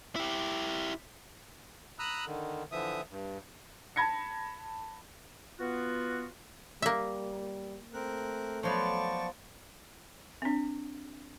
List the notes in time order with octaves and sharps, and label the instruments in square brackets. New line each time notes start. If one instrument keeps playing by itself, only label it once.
[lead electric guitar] E4 G4
[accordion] A#5 B5 D#6 E6 F#6
D3 D#3
D3 E3 F3 E5 D#6
G2
[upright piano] A5 B5 G#6 A#6 C#7
[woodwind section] B3 F4 F#4
[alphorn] G3 [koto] A#3 E5
[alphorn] A3 [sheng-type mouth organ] C4 A#4 F#6
[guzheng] F3 F#3 B3 [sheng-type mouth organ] D5 A5 C#6
[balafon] C4 D4